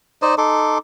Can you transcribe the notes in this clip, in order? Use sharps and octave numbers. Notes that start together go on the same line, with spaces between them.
D#4 C5 D5 D#5
D#4 A4 C6 D6